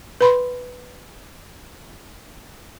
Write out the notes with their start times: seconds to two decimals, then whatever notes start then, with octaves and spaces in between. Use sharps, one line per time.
0.21 B4 B5 C6